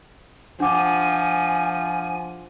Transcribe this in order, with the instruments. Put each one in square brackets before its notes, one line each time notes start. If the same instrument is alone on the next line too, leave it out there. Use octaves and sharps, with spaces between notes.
[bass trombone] F3 [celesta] D4 F#5 D6 [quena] G#5